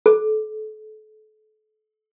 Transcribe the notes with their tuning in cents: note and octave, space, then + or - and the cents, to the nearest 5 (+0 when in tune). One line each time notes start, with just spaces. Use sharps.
A4 -35